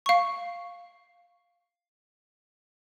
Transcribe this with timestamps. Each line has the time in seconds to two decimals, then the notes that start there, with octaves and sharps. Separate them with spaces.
0.06 F5 C#6